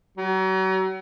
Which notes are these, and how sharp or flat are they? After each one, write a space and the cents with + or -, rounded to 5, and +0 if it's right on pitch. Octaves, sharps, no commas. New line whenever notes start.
F#3 +40